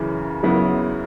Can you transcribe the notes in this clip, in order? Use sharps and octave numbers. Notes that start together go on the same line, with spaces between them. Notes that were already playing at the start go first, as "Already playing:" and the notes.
Already playing: F#2 C#3 E3
F#2 C#3 F#3 B3 E4